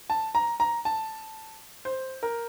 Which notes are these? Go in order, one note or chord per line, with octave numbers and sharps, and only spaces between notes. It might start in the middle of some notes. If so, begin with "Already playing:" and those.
A5
A#5
A#5
A5
C5
A#4